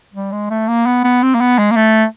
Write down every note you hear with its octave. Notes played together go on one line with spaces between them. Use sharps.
G3
G#3
A3
A#3
B3
B3
C4
A#3
B3
G#3
A#3
A3